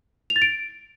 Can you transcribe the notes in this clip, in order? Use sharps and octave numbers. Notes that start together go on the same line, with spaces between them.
F7
A6
D7